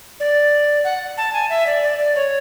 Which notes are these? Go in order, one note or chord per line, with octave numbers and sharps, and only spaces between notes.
D5
F#5
A5
G#5
E5
D5
D5
D5
C#5